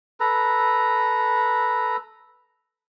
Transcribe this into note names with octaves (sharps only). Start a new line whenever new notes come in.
A4 B4 A#5